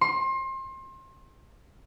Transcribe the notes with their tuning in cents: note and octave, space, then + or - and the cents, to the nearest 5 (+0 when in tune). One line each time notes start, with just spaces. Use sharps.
C6 +30